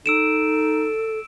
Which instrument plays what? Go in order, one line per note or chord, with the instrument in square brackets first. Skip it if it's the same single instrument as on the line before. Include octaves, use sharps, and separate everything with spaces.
[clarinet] D#4 [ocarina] A4 [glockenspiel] E6 D7 E7